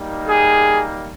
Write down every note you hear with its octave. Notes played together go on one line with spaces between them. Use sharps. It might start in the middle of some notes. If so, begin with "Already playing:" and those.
Already playing: G3 A#3 D#4
G#4